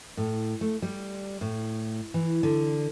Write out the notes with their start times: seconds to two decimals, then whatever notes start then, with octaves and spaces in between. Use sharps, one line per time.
0.17 A2
0.61 A3
0.82 G3
1.41 A2
2.14 E3
2.43 D3